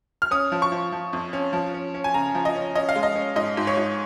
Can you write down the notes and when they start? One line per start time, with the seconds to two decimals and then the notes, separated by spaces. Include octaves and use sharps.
0.22 F6
0.31 C#4 D#6
0.52 F3
0.62 C#6
0.72 F3
0.92 F3
1.13 F2
1.33 C#4
1.53 F3
1.74 C#4
1.94 C#4
2.04 G#5
2.14 C#3 A#5
2.35 F3
2.45 D#5
2.55 C#4
2.75 C#4 D#5
2.89 F5
2.96 G#3
3.03 D#5
3.16 C#4
3.36 G#2 D#5
3.57 G#2
3.67 C#5
3.77 G#2